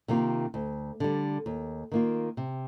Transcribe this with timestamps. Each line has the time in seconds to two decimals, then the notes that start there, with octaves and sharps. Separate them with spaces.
0.08 C3 D#3 A#3 F4
0.54 D2
1.00 D3 G3
1.46 D#2
1.92 D#3 A#3 F4
2.37 C3